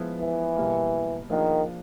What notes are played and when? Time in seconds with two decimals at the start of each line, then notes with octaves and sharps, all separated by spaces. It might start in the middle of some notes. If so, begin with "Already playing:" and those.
Already playing: F3 G#3 B3 E4
0.20 E3
0.56 B2 G3 A#3
1.30 D#3 F3 A#3 D4 F4 G#4